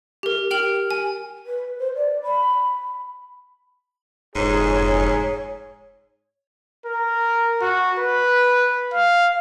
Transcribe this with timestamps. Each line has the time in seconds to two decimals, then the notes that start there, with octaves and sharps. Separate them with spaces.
0.23 G4 A#4
0.51 G4 G5 F6 F#7
0.91 G#5
1.46 B4
1.79 C5
1.95 D5
2.23 B5
4.35 F1 G#2 G#4 C#5
6.86 A#4
7.61 F#4
7.99 B4
8.93 F5